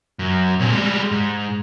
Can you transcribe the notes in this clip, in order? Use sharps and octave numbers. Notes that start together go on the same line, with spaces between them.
F#2
A#2 C4
G3 G#3
G#2